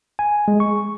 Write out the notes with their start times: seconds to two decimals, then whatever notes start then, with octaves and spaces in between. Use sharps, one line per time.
0.19 G#5
0.48 G#3
0.60 C#6